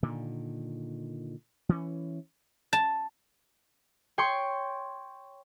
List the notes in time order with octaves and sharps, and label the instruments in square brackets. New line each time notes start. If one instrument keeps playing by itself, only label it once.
[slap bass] A#2 D3 D#3
E3 C#4
[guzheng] A5
[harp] C#5 G5 C6 C#6